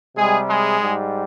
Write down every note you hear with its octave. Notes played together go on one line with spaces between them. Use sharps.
C3 G3 G#3 G#4
G#3 G#4
G#2 G3